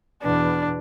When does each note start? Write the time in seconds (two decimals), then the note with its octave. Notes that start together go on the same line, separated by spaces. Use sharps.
0.23 E2 B2 D4